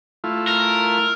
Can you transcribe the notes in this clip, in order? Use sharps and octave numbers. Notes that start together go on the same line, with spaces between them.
A3 E4 F4
A#4